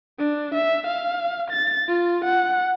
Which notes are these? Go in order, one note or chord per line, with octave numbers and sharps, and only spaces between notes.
D4
E5
F5
A6
F4
F#5